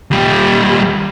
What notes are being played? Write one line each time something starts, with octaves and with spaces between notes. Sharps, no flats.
D#2 G3